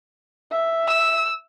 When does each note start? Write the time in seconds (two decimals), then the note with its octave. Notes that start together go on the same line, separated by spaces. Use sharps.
0.51 E5
0.88 E6